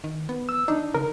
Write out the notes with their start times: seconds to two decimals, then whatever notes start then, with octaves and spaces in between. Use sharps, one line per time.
0.04 D#3
0.29 B3
0.49 E6
0.68 D4 D#4
0.95 C#3 A#4